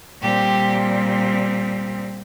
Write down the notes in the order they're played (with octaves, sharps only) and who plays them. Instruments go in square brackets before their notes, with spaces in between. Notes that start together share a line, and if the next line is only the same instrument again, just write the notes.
[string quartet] A#2 G3 C4 G4